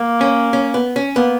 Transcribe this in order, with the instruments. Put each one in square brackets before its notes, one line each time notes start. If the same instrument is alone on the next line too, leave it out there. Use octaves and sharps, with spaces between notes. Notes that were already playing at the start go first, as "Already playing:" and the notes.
Already playing: [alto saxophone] A#3
[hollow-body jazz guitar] C#4
C#4
B3
C#4
[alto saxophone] A#3 [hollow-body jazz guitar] B3